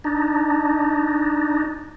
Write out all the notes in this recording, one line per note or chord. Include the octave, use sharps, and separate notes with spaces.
D4 D#4